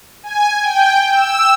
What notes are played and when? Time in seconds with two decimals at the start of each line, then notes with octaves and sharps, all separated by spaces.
0.23 G#5
0.61 G5
1.08 E6